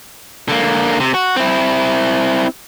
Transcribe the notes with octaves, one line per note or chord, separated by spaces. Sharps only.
D3 A#3
C3
F#4
C4 E4